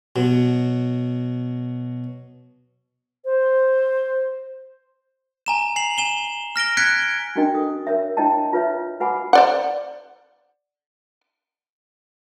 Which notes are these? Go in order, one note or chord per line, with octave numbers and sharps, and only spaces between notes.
B2 F#3
C5
G#5 A#5 E7
G#5 C7 F7 F#7
G#5 E7 G7
F6 A#6 D7 G7
F#6 G#6 B6 C#7 D7 G7
C#4 D4 F#4 A#4 D#5 G5
A4 D#6
A#4 C#5 E5
D4 E4 C#5 D#5 G5 A5
F4 B4 C#5 E5
F#4 B4 F#5 G#5 B5 D6
C5 D5 F#5